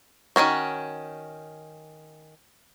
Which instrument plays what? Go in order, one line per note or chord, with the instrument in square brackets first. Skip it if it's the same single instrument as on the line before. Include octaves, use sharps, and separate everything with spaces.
[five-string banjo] D#3 F3 C#4 F#4